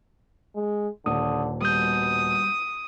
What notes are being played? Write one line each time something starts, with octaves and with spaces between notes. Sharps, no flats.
G#3
D#1 D3 D#6
B2 G3 D#6 G6